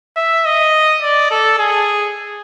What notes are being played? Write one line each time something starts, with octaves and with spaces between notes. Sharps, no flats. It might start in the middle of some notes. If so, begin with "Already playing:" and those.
E5
D#5
D5
A4
G#4